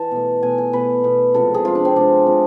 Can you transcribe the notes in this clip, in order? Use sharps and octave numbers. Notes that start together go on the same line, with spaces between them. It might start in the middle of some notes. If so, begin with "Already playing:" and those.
Already playing: E3 A5
B2 A3
B2 A3 G#5
G#5
B2 A3 B4
B2 A3
C3 F3 G#3 A4
G#4
C3 F3 G#3 F4
D4
C4
C3 F3 G#3 D4
C3 F3 G#3